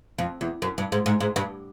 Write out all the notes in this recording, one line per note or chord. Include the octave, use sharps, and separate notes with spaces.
F2
E2
F#2
G2
G#2
G#2
G#2
G2